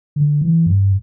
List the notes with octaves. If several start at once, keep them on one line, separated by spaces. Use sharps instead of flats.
D3
E3
G2